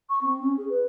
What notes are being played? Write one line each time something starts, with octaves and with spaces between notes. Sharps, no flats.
C#6
C4
C#4
G#4
B4